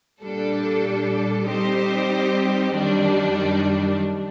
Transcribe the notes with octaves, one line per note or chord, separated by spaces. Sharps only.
A#2 G3 D4 A4
G3 C4 D#4 G4 C5
F#2 D#3 G3 D4